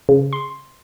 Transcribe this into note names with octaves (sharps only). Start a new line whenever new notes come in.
C#3
C6